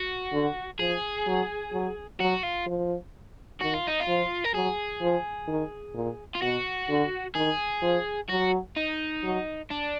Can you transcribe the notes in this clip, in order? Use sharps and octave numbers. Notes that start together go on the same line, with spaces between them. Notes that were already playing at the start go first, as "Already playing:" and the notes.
Already playing: F#4
D3
F3 G#4
F#3
F#3
F#3 F#4
F4
F3
D#3 F#4
F4
D#4
F4
F3
A#4
F#3 G#4
F3
D#3
A#2
F4
B2 F#4
D3
D#3 G#4
F3
F#3 F#4
D#4
F#3
D4